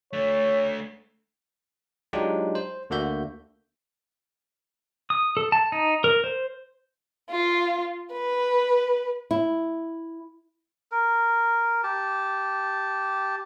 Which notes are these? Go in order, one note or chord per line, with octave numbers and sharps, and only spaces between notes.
A3 D4 C#5
F#3 G#3 D4 D#4 F4 G4
C5
D2 D3 A#3 F#4 E5 G6
D#6
A4
A5
D#4
A#4
C5
F4
B4
E4
A#4
G4 A5